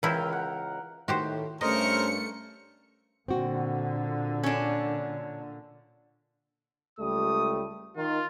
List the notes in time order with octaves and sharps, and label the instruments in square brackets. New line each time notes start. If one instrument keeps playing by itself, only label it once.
[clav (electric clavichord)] C#2 E5 [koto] E3 E4 [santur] A#4 F5 G5
[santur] F#5
[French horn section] A2 D#3 [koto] F#4 G4 C5
[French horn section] G2 C#4 [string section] A3 C#7 [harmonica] A#4 C5 [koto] D#5
[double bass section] A#2 D3 [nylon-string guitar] C4 F#4
[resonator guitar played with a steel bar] C#4 D4
[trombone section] C#2 G3 A3 [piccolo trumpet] D#6
[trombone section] D#3 [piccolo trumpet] F4